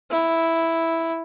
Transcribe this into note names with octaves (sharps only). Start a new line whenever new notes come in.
E4